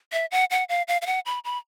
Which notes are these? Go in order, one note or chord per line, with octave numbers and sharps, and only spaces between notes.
E5
F#5
F#5
F5
F5
F5
F#5
B5
B5